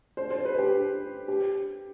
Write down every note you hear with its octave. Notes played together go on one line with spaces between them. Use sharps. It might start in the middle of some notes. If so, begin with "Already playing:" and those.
C5
C5
B4
G4
G4